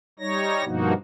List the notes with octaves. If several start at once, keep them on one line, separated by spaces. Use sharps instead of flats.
G3 D#4 C#5 A#6
G2 B2 F3 A#3 D#4 F#4